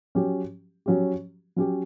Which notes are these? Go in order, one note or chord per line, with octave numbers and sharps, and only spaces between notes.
F#3 C#4 G4
F#3 C#4 G4
F#3 C#4 G4